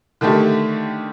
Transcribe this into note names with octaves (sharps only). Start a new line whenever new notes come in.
D3 D#3 A3 G4